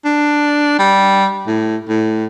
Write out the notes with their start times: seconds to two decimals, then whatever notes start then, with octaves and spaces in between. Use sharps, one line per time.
0.05 D4
0.79 G3
1.47 A2
1.89 A2